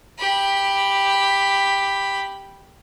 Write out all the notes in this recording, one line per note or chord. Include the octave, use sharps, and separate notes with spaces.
G4 B5